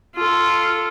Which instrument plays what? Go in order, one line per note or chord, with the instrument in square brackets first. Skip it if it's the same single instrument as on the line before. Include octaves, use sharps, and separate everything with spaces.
[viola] F4 A4